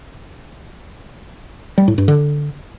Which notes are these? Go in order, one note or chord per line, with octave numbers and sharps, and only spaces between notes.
G3
A2
G2
D3